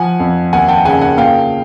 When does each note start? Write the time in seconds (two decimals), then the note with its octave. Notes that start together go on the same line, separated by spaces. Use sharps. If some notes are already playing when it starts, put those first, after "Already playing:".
Already playing: F3 F#5 G#5
0.20 F2
0.53 D#2 F#5 G#5
0.68 G5 A5
0.85 C#3 F#5 G#5
1.01 F#5 G#5
1.17 A#2 F5 G5